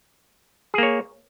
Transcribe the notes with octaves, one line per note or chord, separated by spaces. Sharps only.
A#3 G#4 C#5